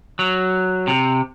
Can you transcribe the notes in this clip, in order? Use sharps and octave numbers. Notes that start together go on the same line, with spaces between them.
F#3
C3